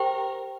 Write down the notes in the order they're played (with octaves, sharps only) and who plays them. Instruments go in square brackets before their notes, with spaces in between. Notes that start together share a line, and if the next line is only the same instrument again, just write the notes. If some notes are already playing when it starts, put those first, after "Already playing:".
Already playing: [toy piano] G4 C5 G5 [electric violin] A#4